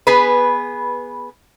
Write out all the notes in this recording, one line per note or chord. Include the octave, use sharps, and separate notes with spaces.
B3 G#4 B4